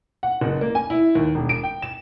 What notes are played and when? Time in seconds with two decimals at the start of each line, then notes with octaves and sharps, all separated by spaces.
0.23 F#5
0.41 F#1
0.61 A#3
0.75 G#5
0.90 E4
1.15 D#2
1.35 E1
1.49 D7
1.63 G5
1.82 E7